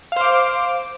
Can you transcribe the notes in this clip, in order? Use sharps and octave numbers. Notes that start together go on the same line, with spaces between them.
C5 F5 D6